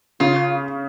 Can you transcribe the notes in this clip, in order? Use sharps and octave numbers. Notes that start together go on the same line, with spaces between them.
C#3 F4